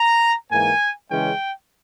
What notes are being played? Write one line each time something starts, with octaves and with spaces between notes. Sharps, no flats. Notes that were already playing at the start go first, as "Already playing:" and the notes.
Already playing: A#5
G#2 E3 A#3 G#5
C#3 E3 G#3 C#4 G5